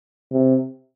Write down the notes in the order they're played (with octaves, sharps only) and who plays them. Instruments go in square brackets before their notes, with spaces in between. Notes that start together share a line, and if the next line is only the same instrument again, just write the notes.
[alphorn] C3